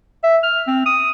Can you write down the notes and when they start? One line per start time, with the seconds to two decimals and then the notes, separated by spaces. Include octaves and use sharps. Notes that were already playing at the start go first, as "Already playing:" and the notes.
0.24 E5
0.43 F6
0.68 C4
0.86 D#6